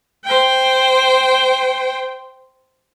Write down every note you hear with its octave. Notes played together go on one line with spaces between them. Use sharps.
C5 G5